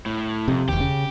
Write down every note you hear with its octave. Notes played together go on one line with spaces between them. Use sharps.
A2
F2 C3
E1 D#2 G4
C#3